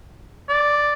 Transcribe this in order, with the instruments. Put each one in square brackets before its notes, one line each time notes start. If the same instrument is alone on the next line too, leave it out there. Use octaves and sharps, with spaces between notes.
[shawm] D5